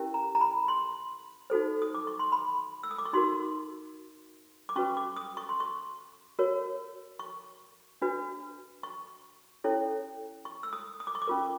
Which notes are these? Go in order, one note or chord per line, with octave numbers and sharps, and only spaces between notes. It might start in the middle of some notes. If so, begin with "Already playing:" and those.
Already playing: C#4 E4 G4 A#4
A#5
A#5
B5
C6
D#4 F#4 A4 C5
D#6
D6
C#6
C6
B5
E6
D#6
D6
C#6
D#4 F#4 A#4 C6
D6
C#4 F#4 B4 C#6
D6
D#6
C#6
C6
C#6
F#4 A#4 C#5
C#6
D4 F#4 B4
C#6
C#4 E4 A4 C#5
C#6
E6
D#6
D#6
D6
C#6
D6
C#4 F4 A#4